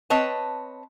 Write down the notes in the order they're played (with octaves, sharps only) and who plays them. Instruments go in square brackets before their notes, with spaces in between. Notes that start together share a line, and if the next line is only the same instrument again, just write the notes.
[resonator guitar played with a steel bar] C4 B4 C#5 D#5 A5